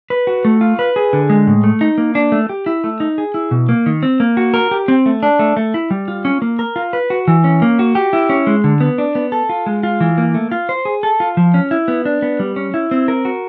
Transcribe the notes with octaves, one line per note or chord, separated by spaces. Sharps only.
B4
F#4
A3
F4
B4
G#4
D3
G#3
A2
A3
D#4
A#3
D4
A3
G4
E4
A3
D#4
G#4
E4
B2
A#3
D#3
C4
A#3
F#4
A#4
G4
C4
A3
D4
A3
A3
E4
G3
F4
C#4
A#3
A#4
F4
B4
F#4
E3
C#4
A#3
F#4
G4
E4
C#4
G#3
D3
B3
D4
B3
A4
F4
G#3
F4
E3
A#3
A3
F4
C5
G#4
A4
F4
F3
C#4
E4
B3
D4
B3
G3
C#4
E4
C4
A#4
F#4